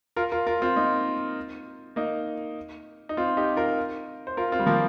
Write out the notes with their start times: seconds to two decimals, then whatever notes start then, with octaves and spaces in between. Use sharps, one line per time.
0.16 F4 A#4
0.32 F4 A#4
0.47 F4 A#4
0.62 C4 F4
0.76 A#3 D#4
1.96 A#3 D#4
3.09 D#4
3.17 C4 F4
3.37 D#4 G4
3.56 F4 A#4
4.27 C5
4.37 F4 A#4
4.52 C4 F4
4.59 G3
4.66 F3 A#3